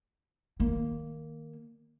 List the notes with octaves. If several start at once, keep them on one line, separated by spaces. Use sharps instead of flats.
D#3 A#3